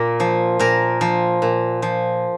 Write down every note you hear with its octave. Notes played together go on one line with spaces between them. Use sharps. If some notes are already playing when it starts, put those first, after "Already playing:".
Already playing: A#2 A#4
F3
A#2 A#4
F3
A#2
F3